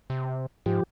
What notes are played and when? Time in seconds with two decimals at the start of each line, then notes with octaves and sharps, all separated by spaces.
0.10 C3
0.66 G#2 F3 G4